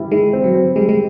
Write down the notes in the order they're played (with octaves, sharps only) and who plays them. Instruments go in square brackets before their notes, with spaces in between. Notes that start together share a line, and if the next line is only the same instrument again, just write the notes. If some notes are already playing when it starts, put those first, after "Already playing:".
Already playing: [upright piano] G3 E4
[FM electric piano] G#3 [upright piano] E4
[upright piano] C4
[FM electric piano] F#3
[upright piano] C4
[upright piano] G3 [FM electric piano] G#3
[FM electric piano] G#3